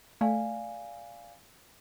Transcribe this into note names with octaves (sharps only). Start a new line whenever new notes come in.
A3 D5 F5 G#5